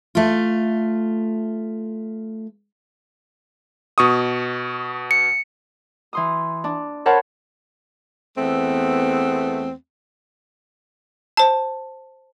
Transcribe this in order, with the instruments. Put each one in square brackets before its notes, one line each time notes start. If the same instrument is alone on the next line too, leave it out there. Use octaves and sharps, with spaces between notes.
[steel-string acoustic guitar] A3 F4
[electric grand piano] B2 C#6 D#6
[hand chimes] C#7
[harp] E3 C6 D#6
D4
A#4 C5 C#5 F#5 A5 B5
[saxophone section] E2 A3 B3 C4
[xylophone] C5 A5